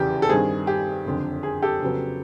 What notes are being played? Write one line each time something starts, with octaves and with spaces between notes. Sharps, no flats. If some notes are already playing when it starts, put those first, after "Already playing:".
Already playing: F1 E2 C#3 E3 G4
A4
G2 D#3 G3 C4 G#4
G4
F#1 F2 D3
G#4
G4 A4
F2 C#3 F#3 B3